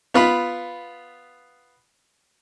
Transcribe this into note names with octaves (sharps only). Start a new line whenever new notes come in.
B3 F4 B5